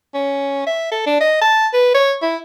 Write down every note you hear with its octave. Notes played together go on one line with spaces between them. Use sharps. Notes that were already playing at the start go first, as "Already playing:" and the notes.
C#4
E5
A4
D4
D#5
A5
B4
C#5
E4